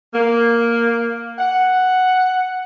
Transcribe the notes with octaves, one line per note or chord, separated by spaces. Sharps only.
A#3
F#5